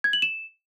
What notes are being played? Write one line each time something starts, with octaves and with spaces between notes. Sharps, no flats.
G#6
F#7
E7